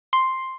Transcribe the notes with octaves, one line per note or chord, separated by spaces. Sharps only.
C6